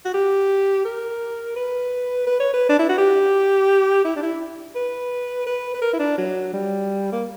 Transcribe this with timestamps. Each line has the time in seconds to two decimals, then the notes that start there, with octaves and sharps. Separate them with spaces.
0.05 F#4
0.14 G4
0.85 A#4
1.56 B4
2.27 B4
2.40 C#5
2.54 B4
2.69 D4
2.79 E4
2.89 F#4
2.98 G4
4.05 E4
4.16 D4
4.23 E4
4.75 B4
5.47 B4
5.74 B4
5.82 A#4
5.93 E4
5.99 D4
6.18 F#3
6.53 G3
7.12 A#3